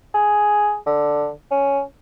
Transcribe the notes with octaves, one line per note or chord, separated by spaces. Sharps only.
G#4
D3
C#4